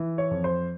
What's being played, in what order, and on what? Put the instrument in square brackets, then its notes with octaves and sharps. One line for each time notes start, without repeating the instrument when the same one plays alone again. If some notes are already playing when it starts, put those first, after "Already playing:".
Already playing: [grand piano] E3
C#5
F2
C5